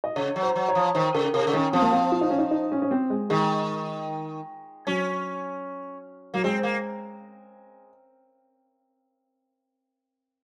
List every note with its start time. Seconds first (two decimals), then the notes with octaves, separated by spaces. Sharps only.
0.04 D#5
0.16 C#3 C#5
0.36 F#3
0.43 C5
0.56 F#3
0.68 C#5
0.75 F3
0.95 D#3 C5
1.14 C#3 A#4
1.34 C3 A#4
1.47 C#3
1.53 D#3 C#4
1.73 F3 C4
1.82 A#3
1.91 C4
2.12 F4
2.21 D#4
2.30 C#4
2.38 D#4
2.51 D#4
2.72 C#4
2.82 C#4
2.91 C4
3.10 G#3
3.30 D#3 G#3
4.87 F#3 C#4
6.34 F#3 A#3
6.44 G#3 C4
6.63 A#3